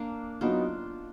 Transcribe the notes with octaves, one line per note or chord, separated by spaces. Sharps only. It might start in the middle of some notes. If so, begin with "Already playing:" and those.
Already playing: A#3 D4
F#3 B3 D4 D#4 F4 F#4